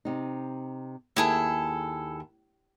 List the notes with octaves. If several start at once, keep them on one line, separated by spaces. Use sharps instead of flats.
C3 D#4
D#2 E4 G#4 A4